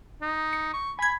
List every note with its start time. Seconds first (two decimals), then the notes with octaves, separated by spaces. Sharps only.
0.22 D#4
0.53 C#7
0.73 C#6
0.99 G#5 B5 G#6